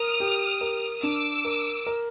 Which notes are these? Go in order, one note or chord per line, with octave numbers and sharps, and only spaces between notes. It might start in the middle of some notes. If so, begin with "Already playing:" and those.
Already playing: A#4 D#6 F6
G4
A#4
D4 D6 E6
A#4
A#4